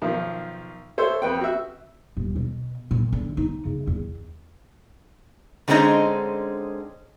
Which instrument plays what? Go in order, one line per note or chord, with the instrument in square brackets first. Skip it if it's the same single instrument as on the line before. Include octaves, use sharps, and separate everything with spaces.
[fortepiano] B1 D#3 F3
A4 C5 C#5 E5
F2 B4 G5
F#4 E5
[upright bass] D#1
B2
A#2
D3
D#4
C#3
E2
[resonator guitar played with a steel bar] D3 G#3 C4 C#4 D#4 D#5